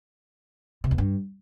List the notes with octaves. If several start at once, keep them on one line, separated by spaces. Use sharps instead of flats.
C3
E2
G2